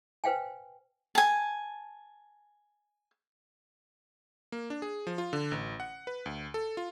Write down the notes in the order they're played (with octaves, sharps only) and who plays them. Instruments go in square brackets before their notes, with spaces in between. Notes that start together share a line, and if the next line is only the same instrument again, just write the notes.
[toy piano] B4 C5 F5 G5 G#5
[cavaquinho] G#5 A5
[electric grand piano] A#3
D4
G#4
F3
F4
D3
A1
F#5
B4
D2
A4
F4